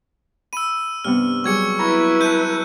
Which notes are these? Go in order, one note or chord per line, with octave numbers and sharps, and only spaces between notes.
B5 E6 D#7
G2 C3 B3 F6
F#3 G3 G#4 C#6 G#6 C#7
E4 B4 A#5 B5 C#6 G#6
F#4 A5 A#5 F#6 G6 D#7